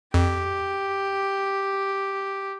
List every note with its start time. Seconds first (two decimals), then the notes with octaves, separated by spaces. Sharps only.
0.14 F2 G4